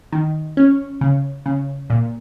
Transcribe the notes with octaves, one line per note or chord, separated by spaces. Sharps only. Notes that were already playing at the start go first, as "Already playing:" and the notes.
D#3
C#4
C#3
C#3
A#2